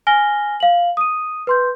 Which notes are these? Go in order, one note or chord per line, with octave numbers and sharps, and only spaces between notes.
G#5 F6 A#6 G7
F5 F#7
D#6 D#7
B4 C6 G6